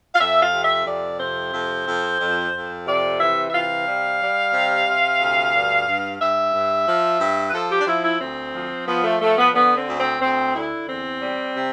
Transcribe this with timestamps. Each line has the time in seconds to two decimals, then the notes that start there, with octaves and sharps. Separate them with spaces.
0.14 F5
0.19 F2 E5
0.41 F5
0.52 C3
0.64 E5
0.86 F2 D5
1.19 C3 C5
1.53 F2
1.86 F2
2.20 F2
2.53 F2
2.86 C3 D5
3.19 E3 E5
3.48 E5
3.53 C3 F5
3.86 G3
4.20 G3
4.53 C3
4.86 C3
5.20 D2
5.53 G2
5.86 G2
6.19 G2 E5
6.53 G2
6.87 F3
7.20 G2
7.48 B4
7.53 F3 A4
7.70 G4
7.79 D4
7.87 F3 E4
8.03 E4
8.20 D2 C4
8.53 F3
8.87 F3 B3
9.04 A3
9.20 F3 A3
9.37 B3
9.53 D3 B3
9.76 C4
9.87 D2
9.99 C4
10.20 D2 C4
10.54 D3 E4
10.87 E2 C4
11.20 G3
11.54 C3